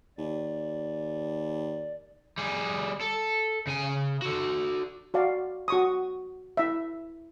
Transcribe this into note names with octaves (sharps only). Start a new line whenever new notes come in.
D#2 D5
G3 G#4
A4
C#3 G#5
F#4 A4
F#4 D5 F5
F#4 C#6 D#6
E4 E5